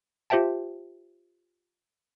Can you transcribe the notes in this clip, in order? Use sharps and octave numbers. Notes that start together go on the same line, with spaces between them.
F4 G4 C5 E5 G5 A5